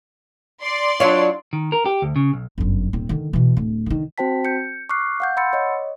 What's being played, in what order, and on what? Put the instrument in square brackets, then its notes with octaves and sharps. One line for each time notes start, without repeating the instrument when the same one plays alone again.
[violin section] D5 C6
[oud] F#3 D4 F4 [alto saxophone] C#5
[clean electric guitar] D#3
A#4
G4
D2
C#3
B1
[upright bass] G1 F#2
D#1 C4
D3 D#3
B2 E3
D1
D3 D#3
[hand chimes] C4 F#4 C5 G5 A5 B6
G6 C#7
C#6 D6 F6 F#6 C7
F5 F#5 G6
F#5 B5 C6 E6 A6 C#7
C#5 D#5